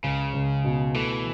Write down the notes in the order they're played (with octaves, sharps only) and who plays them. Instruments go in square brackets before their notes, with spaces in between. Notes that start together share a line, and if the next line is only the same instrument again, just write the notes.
[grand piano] C#2 [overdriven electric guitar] C#3
[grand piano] C#2
B2
[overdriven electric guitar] E3 [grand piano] A3